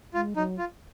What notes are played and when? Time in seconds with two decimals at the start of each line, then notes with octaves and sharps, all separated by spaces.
0.14 G#3 F4
0.36 F#3 D#4
0.58 F4